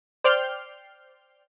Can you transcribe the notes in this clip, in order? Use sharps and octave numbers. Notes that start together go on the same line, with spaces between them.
C5 D5 G5 F6 G6 C7